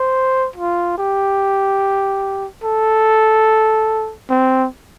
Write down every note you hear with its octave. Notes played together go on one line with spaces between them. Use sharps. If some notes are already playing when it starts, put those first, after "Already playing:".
Already playing: C5
F4
G4
A4
C4